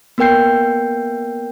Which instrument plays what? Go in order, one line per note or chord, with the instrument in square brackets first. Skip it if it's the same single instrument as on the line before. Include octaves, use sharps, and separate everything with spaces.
[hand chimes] A#3 B3 A#4 G5 G6 C7